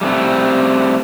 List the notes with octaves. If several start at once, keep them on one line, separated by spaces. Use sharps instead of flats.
G3 A3 C4